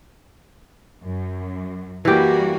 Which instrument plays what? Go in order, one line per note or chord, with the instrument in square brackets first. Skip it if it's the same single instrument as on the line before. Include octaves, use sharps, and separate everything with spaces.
[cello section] F#2
[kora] E3 G4 [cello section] G3 A#3 F#4